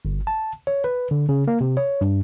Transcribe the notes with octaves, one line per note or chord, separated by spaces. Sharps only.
G1
A5
C#5
B4
D3
C#3
A#3
C3
C#5
G2